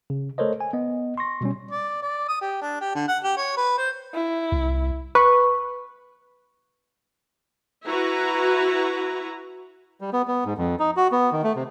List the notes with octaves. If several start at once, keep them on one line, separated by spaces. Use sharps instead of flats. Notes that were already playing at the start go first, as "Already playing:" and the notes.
C#3
A3 A4 A#4 C5 C#5 D#5
G#5
B3 D#5
C6 C#6 A#6
B2 G3 C#4
D5
D5
D#6
G4
D4
G4
D3
F#5
G4
C#5
B4
C5
E4
C2
B4 C#6
E4 F#4 B4 A#5
G3
B3
B3
G#2
F2
D#4
F#4
B3
D#3
A3
C3